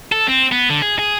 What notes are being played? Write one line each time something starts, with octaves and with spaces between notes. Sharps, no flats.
A4
C4
B3
D3
G#4
G#4